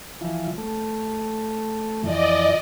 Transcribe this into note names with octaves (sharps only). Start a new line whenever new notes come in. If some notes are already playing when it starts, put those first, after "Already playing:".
E3 F3
A3
F2 E3 D5 D#5